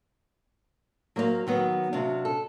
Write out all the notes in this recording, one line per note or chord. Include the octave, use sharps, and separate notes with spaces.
F#3 A#3 C5 D5 F5
D#3 F#3 B3
C3 F#3 D4 F5
A4